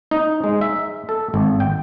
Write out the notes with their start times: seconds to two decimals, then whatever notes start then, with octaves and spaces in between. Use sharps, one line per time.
0.11 D#4
0.44 G#3
0.61 E5
1.09 A4
1.34 G#1
1.60 G5